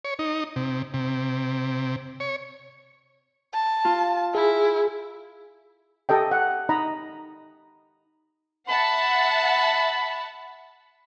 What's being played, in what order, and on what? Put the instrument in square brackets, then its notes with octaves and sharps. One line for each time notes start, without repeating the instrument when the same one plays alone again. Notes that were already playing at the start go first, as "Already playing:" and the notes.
[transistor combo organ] C#5
D#4
C3
C3
C#5
[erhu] A5
[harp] F4
[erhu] E4 [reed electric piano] G#4
[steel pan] G4 A4 D#5 G5
F#5
D#4 D#5 A#5 B5
[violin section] E5 F#5 A5 [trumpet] B5